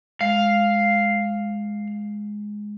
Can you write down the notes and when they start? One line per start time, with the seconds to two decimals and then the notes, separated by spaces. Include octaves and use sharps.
0.21 G#3 F5